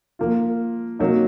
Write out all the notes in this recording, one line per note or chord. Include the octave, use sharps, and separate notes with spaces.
F3 A#3 F4
C3 F#3 A#3 D#4